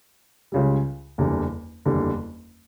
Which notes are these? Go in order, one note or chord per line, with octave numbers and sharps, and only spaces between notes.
C#2 C#3 G3
F#1 E2 D3 G3
F#1 E2 D3 G3